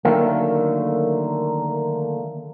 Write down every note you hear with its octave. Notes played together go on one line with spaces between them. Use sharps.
D3 D#3 F#3 A3 A#3